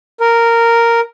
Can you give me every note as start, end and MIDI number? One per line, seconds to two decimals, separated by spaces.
0.20 1.00 70